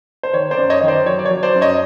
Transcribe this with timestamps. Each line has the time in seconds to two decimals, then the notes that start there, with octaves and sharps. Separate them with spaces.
0.23 C5
0.33 D#3 C#5
0.51 C5 D5
0.58 F#2
0.70 C#5 D#5
0.81 D#3 D#5
0.88 C5 D5
1.06 F#3 C#5
1.19 D5
1.25 C#5
1.31 F#3
1.43 C5 D5
1.56 F#2
1.61 C#5 D#5